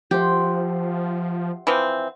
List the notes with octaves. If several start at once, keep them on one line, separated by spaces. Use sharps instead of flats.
F3 G4 C5 E5 F#5
E3 F3 C4